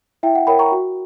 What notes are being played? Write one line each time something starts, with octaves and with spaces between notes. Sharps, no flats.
E4 E5 G5
F#5
A#4 C#5 G5 B5
A#5 C#6
F#4